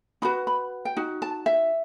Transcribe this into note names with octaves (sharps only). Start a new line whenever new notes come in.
D#4 F#4 B4 B5
B5
G5
D#4 F#4
A5
E5